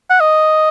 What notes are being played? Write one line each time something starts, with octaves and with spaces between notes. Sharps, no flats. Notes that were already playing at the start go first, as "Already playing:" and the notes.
F#5
D#5